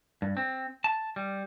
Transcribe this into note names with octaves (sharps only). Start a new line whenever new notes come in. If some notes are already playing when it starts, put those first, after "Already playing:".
G2
C4
A5
G3